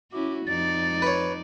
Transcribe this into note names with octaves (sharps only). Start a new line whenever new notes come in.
C#4 E4 F#4 D6
F2 D#4 D5 A6
B4 C#5